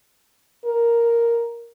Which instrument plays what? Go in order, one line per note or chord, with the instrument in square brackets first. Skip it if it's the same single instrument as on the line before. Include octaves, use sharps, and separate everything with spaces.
[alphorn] A#4